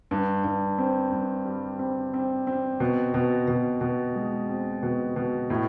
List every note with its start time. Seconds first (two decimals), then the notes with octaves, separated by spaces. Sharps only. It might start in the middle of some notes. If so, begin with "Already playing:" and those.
0.11 G2
0.44 G2
0.78 C4
1.12 G2
1.46 G3
1.79 C4
2.14 C4
2.47 C4
2.80 B2
3.14 B2
3.48 B2
3.81 B2
4.15 G#3
4.49 C4
4.83 B2
5.16 B2
5.50 A2